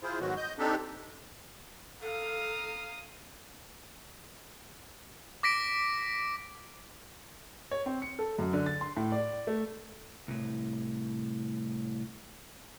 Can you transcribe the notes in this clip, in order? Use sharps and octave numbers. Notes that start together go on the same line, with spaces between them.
E4 F4 G#4 C5
G#2 D#3 F#3 G#3 B3 F#4
D#5 G6
C4 D4 D#4 G4 A4
A4 F5 A#5 D#6
D6 A#6 B6 D7
C#5
C4
C#7
A4
F#2
D3
A6
C6
A2
D5
A3
C2 A2